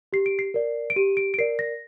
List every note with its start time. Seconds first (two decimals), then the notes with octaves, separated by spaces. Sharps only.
0.13 G4 C7
0.26 D7
0.39 C7
0.54 A#4 D5
0.90 D7
0.96 G4 D#7
1.17 D7
1.34 D7
1.39 A#4 D5 C7
1.59 A#6